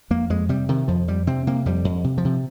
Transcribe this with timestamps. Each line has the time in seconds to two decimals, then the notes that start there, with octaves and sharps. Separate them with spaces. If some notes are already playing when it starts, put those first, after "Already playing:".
0.10 F2 A#3
0.30 F2 G#3
0.49 C3 G3
0.68 C3 D#3
0.88 F2 F3
1.08 F2 G3
1.27 C3 C4
1.47 C3 A#3
1.66 F2 G3
1.85 F2
2.04 C3
2.18 F3
2.25 C3